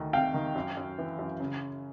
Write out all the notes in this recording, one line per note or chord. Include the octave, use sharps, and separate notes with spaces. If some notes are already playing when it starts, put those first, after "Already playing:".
Already playing: D2 D#3
C3 F5 G5
D#3
F#2
F#2
E3
F#2
C#3